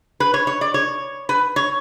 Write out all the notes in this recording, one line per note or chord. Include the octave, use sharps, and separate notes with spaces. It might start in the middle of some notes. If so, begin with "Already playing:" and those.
B4
C#5
C#5
D5
C#5
B4
C#5